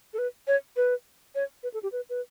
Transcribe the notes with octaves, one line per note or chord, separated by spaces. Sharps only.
A4
B4
C#5
B4
C#5
B4
A4
G4
B4
B4